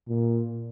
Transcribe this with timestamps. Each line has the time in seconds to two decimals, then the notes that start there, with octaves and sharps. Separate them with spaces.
0.08 A#2